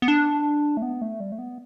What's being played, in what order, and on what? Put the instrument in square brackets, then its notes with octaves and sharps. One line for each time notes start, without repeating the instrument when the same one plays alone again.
[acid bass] B3
D4
A3
B3
A3
G3
A3
B3